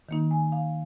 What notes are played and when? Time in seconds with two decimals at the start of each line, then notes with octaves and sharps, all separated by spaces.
0.09 D#3 A#3 D#4
0.31 G#5
0.52 F5